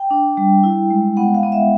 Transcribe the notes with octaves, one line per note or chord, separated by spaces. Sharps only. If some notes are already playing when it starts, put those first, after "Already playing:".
Already playing: G5
D4
G3
E4
G#3
B3 F#5
F5
B3
E5